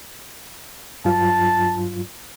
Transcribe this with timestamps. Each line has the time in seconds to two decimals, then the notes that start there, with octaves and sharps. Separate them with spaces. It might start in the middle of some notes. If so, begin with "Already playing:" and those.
1.05 G2 F#3 F4 A5